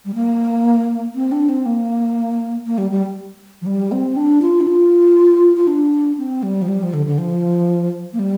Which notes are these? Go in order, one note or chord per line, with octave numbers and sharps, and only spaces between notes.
G3
A#3
C4
D4
C4
A#3
A#3
G3
G3
F3
G3
C4
D4
F4
D4
F4
F4
D4
C4
G3
F3
G3
F3
D3
D3
F3
A#3
G3